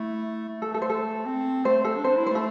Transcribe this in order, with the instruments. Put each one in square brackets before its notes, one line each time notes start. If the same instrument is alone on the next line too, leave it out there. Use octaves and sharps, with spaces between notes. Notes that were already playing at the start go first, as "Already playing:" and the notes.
Already playing: [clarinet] A3 [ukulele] E4
[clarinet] A3
[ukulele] A4
A4
C5
A4
[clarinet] C4
[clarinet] A3 [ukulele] C5
[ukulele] A4
[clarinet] D4
[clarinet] C4 [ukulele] C5
[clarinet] D4
E4
[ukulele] C5
[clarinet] A3
[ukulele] A4